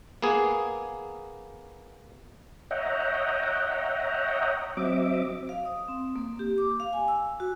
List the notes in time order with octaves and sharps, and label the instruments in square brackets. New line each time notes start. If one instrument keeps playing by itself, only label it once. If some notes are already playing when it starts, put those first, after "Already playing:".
[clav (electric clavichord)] A#3 B3 G#4
[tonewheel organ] C#5 D#5 E5 F#5 G5 A#5
F#3 C4 D#5 E5 D6
[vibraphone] F5
D#6
C4
A#3
G4
D6
F5
G#5
E6
F#4